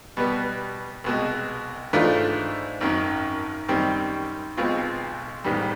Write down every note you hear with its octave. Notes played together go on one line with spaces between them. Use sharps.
B2 G3 B3
C2 B2 G#3
G#2 E3 A3 D4 F4
G#1 F#2 D#3
F#2 D#3 G3 C4
B1 B2 G#3 C4 F4
A1 G#2 D#3 G3 B3